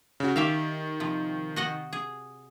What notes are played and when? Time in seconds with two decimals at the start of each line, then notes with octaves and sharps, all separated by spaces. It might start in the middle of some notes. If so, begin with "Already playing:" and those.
0.20 C#3 F#4
0.36 D#3 G4 E5 F5
1.00 C3 F3
1.56 F#4 D#5 F#5
1.93 G#4